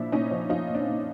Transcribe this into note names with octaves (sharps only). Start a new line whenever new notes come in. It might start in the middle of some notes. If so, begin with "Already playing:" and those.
Already playing: A#2 F3 D4 E4
A#2 C#4 D#4
F3
F3 D#4 F4
A#2
C4 D4
A#2